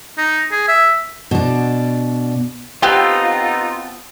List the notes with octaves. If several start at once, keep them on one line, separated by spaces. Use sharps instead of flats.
D#4
G#4
E5
B2 D4
B3 C4 D#4 F4 G4 A4